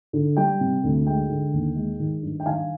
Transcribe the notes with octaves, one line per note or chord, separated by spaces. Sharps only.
D3
G3 G5
C3
D2
G#3 G5
D3
D#2
G#3
D#3
G2
G5
D#3 F5 G#5